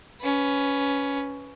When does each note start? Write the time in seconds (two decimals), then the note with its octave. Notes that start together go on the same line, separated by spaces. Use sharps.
0.21 C#4 B4